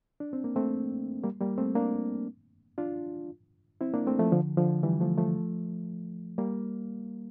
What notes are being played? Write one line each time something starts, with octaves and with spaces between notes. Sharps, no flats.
D4
C4
A#3
A3 C4
G3 A#3
G3 A#3
A3 C4
A#3 D4
D4 F4
C4 E4
A#3 D4
A3 C4
F3 A3
D3 F3
D3 F3
E3 G3
F3 A3
F3 A3
G3 A#3